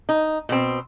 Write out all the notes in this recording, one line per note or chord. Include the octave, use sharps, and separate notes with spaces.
D#4
B2 C4